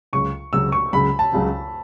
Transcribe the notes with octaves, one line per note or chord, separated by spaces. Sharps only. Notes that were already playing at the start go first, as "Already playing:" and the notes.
C#2 C#3 F#3 C#6
C#2 C#3 F#3 E6
C#6
C#2 C#3 F#3 B5
A5
C#2 C#3 F#3